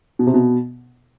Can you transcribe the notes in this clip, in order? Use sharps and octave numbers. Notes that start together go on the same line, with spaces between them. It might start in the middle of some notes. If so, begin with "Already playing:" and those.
B2
C3
B2